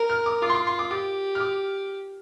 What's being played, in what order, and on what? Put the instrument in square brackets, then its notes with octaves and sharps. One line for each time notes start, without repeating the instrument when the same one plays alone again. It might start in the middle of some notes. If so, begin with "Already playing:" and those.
Already playing: [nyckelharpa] A#4
[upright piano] F6
D6
[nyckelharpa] F4 [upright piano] D6
[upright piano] C6
D6
C6
D6
[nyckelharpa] G4 [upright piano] D6
[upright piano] F6
D6